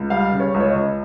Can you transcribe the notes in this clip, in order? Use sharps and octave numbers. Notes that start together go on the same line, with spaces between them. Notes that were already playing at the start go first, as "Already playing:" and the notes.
Already playing: C#2
G3 F5
C#3
C#5
C#2
C#5
D#5
C#2